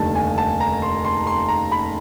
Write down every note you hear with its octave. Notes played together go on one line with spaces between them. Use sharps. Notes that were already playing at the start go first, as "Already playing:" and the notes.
Already playing: F1 D#2 D3 G3 A5
G#5
A5
A#5
C6
C6
C6
A#5
B5